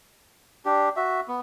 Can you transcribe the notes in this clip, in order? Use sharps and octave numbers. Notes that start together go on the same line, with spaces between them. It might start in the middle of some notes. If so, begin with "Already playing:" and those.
D4 G4
F#4 E5
B3